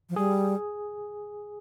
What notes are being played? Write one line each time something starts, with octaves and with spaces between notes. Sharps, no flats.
F3
G3 G#4